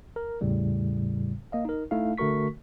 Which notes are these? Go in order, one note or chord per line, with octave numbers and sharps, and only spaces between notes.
A#4
E2 A2 C#3 G3
A#3 D#5 F5
D#4 A#4
A3 D#4 E4 F5
D3 A3 F#4 A#4 C#6 B6